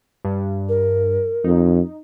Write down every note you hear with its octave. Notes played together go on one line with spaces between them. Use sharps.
G2
A#4
F2 D#4